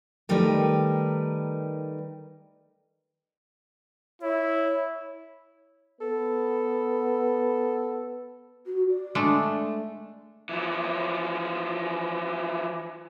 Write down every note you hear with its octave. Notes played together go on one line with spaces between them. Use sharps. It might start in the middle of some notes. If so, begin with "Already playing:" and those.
D#3 G3 A3 D#4 A#4 B4
E4 C#5
B3 A4
F#4
D5
G#3 A3 D4
E3 F3